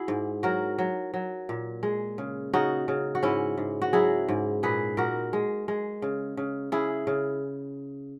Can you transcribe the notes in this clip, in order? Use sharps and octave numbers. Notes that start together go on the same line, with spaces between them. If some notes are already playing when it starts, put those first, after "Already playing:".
Already playing: E4 F#4 G#4
G#2
F#3 F#4 A#4
F#3
F#3
A#2
G#3
C#3
C#3 D#4 F#4
C#3
F#4
G#2 C#4 E4
G#2
F#4
F#3 E4 G#4
G#2
A#2 G#4 B4
A#2 F#4 A#4
G#3
G#3
C#3
C#3
C#3 E4 G#4
C#3